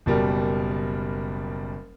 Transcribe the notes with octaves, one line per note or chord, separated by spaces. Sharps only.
F#1 B2 G3 A#4